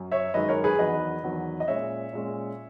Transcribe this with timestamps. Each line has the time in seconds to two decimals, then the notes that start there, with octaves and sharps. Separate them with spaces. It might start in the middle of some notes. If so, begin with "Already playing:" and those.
Already playing: F#2
0.12 C#5 E5
0.34 F#2 D#3 G#3 B4 D#5
0.48 A#4 C#5
0.64 G#4 B4
0.79 E2 D#3 F#3 B4 D#5
1.23 E2 D#3 F#3
1.60 D#5
1.68 A#2 G#3 C#4 C#5 E5
2.13 A#2 G#3 C#4